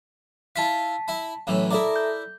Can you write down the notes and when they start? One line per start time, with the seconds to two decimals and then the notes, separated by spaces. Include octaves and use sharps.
0.56 E4 F4 F5 A5 B6
1.08 E4 B5
1.47 F#2 A2 E3
1.71 E4 A4 A#4 D5 E5 A#5
1.96 G6